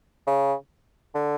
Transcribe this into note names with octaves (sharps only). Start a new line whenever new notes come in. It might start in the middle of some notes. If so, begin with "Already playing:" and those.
C#3
D3